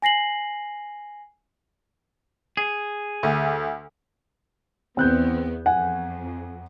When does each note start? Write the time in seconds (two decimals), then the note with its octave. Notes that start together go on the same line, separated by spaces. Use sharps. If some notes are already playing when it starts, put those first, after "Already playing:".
0.02 G#5 A#6 C7 F#7
2.57 G#4
3.23 D2
4.97 E2 B3 C4 F#6 G6
5.66 F2 F#5 G#5